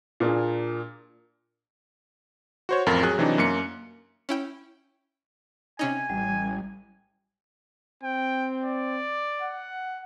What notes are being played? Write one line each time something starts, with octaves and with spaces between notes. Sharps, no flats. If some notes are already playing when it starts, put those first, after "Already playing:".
A#2 A#3 D4 F4 G#4
F#4 C5 C#5
A1 F2 F4 A#4 A6
F#3 G#4 F#6
C3 E3 F#3 D4 D#4
F#2 A#3 C#7
C#4 E4 G5
C3 C#4 D#4 G#5
A1 G3
C4 G5
D5
F#5